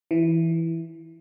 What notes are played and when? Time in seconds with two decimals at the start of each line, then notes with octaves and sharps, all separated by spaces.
0.11 E3